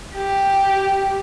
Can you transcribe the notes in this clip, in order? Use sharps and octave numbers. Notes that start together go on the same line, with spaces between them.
G4